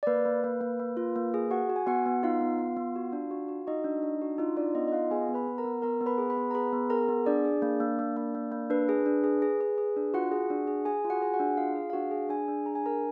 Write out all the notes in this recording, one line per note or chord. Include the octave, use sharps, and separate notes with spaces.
D5
A#3 B4
A#3
A#3
A#3
A#3
F4
A#3
G#4
F#4 F#5
F#4
G#5
B3 F#4 F#5
B3
D#4 F4 F5
B3
B3
B3
F#4
D4
F#4
F#4
D#4 F#4 D#5
D4
D4
F#4
D#4 F4 D#5
D4 F4 D5
B3 D#4 D#5
D#5
F4 F5
B3 G#4 G#5
B3
B4 B5
B3
A#4 A#5
B3
B3 A#4 A#5
B3
B4 B5
G#4
B4 B5
B3
A#5
G#4 B4 B5
B3
G#4 A#4 A#5
B3
D4 G#4 D5
G#4
A#3
A#3
A#3
A#3
A#3
A#3
D4 B4
G#4
D4
G#4
G#4
G#4
G#4
D4
F4 F#4 F#5
G#4
D4
G#4
G#4 G#5
F4
F#4 F#5
G#4 G#5
F#4 F#5
D4
F4 G#4 F5
G#4
F5
D4 F#4 F#5
G#4
D4 G#4 G#5
D4
G#4 A#5
G#5
D4 A#4 A#5